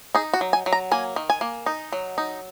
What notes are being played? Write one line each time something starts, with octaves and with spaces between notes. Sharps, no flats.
D#4 G#4
F#4
F#3
G#5
F#3
A#5
A#3 G#5
D#3
G#5
A#3
D#4
F#3
D#4